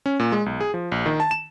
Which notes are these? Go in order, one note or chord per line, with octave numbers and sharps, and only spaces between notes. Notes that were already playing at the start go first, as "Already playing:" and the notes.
C#4
A#2
G#3
B1
G#4
F3
A#1
D#3
A5
E7